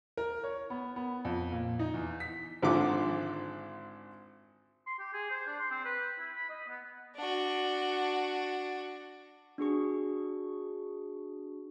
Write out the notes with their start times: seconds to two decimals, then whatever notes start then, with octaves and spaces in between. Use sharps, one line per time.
0.17 A#4
0.43 C#5
0.70 B3
0.96 B3
1.25 F2
1.52 A#2
1.79 D#4
1.94 E2
2.20 B6
2.62 G#1 D3 F3 D#4 D6
4.87 C6
4.99 G4
5.13 G#4
5.31 C5
5.46 D4
5.60 C6
5.71 C4
5.85 B4
6.19 E4
6.35 B5
6.50 D#5
6.68 B3
7.16 D4 F#4
9.58 D4 F#4 G#4 C#6